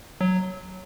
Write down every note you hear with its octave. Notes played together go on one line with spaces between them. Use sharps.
F#3